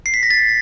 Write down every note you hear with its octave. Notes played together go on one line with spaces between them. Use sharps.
C7
B6
A#6
A6